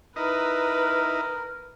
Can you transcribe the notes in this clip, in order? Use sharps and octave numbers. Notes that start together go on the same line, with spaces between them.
D#4 E4 A#4 B4 D#5